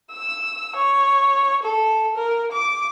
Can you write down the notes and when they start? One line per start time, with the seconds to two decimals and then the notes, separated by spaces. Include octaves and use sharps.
0.12 E6
0.76 C#5
1.63 A4
2.16 A#4
2.52 D6